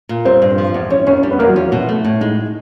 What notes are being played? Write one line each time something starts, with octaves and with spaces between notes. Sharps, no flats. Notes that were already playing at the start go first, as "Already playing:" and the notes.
A#2
G3 C4 C5
G2
F3
E2
G3 C#4 C#5
D#2 C#4 C#5
G3 D4 D5
B3 B4
E2 A#3 A#4
F#3 F#4
F3 C#4 F4
B2
A3
A2
G#3 D#4